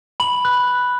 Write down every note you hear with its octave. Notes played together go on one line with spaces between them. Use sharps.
B5 F#7
F#6